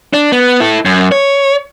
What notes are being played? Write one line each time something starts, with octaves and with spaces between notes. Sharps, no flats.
D4
B3
E4 A4
F#2
C#5